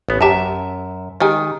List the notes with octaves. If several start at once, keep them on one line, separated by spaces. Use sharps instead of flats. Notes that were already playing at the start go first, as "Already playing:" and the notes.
A1 B3
F#2 G4 E5 A5 A#5
D#3 G#3 G4 G#5